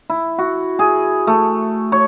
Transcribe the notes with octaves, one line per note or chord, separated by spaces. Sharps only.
E4
F#4
G#4
A3
C#5